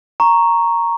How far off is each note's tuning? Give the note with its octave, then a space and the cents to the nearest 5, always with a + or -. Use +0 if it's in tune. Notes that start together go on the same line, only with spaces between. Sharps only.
A#5 +0 C#6 +0